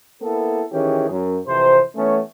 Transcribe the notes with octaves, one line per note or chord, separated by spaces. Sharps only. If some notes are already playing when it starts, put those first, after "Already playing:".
A#3 B3 E4 A4
D#3 E3 C#4 G4 G#4
F#2
F2 C3 E3 C5
E3 A3 B3 C#4